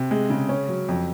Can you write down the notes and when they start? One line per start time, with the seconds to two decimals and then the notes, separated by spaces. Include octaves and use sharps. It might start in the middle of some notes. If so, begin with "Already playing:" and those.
Already playing: C3
0.11 G#3
0.30 C#3
0.49 C#4
0.68 F#3
0.89 F2